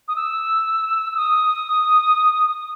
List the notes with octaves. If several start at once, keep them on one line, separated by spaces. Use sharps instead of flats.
D#6
E6
E6
D#6